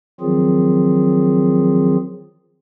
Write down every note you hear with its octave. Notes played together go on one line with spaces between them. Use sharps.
D#3 F3 F#3 C4 F4 G#4